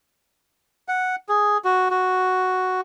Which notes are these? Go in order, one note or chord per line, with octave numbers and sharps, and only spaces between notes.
F#5
G#4
F#4
F#4